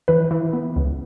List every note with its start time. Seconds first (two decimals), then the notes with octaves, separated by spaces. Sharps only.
0.08 E3 B4
0.31 E3
0.53 B3
0.76 C#2